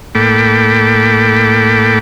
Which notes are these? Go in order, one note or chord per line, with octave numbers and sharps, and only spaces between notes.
A2 A#3 A4 G5 B5 D6